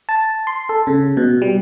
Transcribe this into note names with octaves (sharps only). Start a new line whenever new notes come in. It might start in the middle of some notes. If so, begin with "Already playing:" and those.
A5
C6
A4
C#3
B2
G3